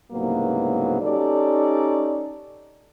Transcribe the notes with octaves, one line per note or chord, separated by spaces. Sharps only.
C2 G#2 C#3 F#3 A#3 B3
C#4 D#4 G4 A4 D5